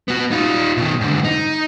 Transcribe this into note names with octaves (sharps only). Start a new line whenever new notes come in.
B3 F#4
D#4 F4
B2 D#3
G#2 D3
D#4